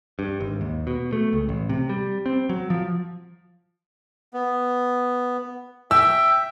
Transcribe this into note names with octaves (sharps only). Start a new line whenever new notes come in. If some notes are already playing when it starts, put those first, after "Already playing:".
G2
G#1
D#2
B2
A3
C#2
A1
C3
G3
C4
F#3
F3
B3
E5 G5 E6